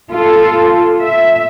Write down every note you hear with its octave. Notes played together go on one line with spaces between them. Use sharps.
F4 A4
E5